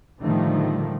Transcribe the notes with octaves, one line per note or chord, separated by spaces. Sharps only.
A2 D3 D#3 F3 G3 A3